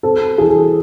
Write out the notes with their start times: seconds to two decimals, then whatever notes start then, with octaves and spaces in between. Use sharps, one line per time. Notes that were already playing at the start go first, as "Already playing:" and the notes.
0.03 C4 A4
0.38 E3 G#4